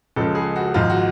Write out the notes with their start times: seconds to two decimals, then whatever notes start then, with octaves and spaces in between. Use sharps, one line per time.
0.16 C#2 C#3 F3 G#3 A4
0.35 G#4
0.56 F#4
0.74 G#1 G#2 F3 F4
0.90 F#4